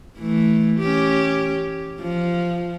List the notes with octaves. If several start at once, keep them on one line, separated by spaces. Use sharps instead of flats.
E3 A3
C#4 G4
F3